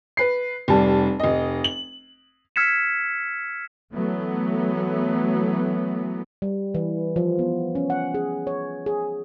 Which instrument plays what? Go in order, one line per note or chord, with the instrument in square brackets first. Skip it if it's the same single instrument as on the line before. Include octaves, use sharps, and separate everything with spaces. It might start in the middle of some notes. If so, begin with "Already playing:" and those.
[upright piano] B4 C7
F1 G3 A5
F1 D#5
F#7
[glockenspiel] E6 F6 G#6 B6 C#7 E7
[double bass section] E3 F#3 A3 B3
[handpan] G3
E3
F3
B3
C#4
F#5
G#4
C#5
G#4